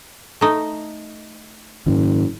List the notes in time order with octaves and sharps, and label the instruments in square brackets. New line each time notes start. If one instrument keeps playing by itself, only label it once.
[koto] A3 D#4
[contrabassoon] F#1 [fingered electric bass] G#2 D#3